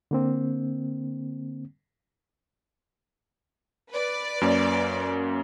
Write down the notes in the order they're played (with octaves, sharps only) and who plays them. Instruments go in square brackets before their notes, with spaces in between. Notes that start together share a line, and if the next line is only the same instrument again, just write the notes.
[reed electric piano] D3 A#3 C4
[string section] B4 D5
[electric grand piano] F#2 A#3 C#4